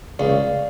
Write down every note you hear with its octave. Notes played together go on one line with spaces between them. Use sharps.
C#2 D5 F5